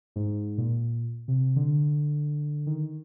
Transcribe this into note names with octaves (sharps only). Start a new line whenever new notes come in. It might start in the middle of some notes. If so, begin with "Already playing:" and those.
G#2
A#2
C3
D3
D#3